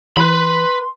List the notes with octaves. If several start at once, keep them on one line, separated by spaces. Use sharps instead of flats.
E3 B4 B5 C6